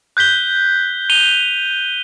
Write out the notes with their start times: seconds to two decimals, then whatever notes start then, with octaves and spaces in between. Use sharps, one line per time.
0.17 F#6 G6 B6 G7
1.10 D#7 F7 G7